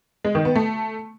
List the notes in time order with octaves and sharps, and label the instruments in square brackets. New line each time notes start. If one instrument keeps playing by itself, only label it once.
[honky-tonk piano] G#3
D#3
B3
A3